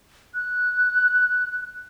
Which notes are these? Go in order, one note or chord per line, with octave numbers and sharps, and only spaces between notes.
F#6